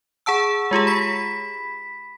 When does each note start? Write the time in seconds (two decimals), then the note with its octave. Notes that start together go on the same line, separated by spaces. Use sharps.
0.26 G#4 F#5 A5 E6
0.71 G#3 F4 G4 G#4
0.87 B5 B6